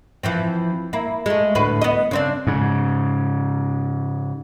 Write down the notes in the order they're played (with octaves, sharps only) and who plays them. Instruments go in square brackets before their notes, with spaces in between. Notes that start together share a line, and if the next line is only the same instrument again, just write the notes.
[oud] E3 F3 C4
A#3 E4
G#3 A3
D2 A2 B4
B3 D#5
C#3 C4 D4
[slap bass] G#2 C#3